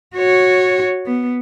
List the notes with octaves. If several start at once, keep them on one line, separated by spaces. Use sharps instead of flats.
F#4 C#5
B3